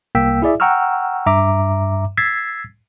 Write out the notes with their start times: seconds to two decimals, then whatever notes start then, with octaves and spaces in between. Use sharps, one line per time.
0.15 C2 A#3 G5 E6 B6
0.42 E4 G#4 D5 E5
0.60 F#5 G5 A#5 C#6 E6 F6
1.26 G2 E5 A#5 D6
2.17 E6 G#6 A6 B6 C7